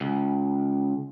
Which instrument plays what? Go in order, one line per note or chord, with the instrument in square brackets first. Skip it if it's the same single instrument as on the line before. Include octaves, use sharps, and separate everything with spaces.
[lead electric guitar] C#2